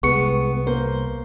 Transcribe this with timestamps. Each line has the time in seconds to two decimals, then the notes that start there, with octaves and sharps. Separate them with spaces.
0.03 C2 G#3 B3 C#6 C#7
0.67 A#3 C5